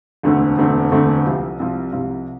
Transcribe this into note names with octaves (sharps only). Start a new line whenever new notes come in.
E1 D2 D3 A3 C4
E1 D2 D3 A3 C4
E1 D2 D3 A3 C4
C2 C3 F3
C2 C3 F3
C2 C3 F3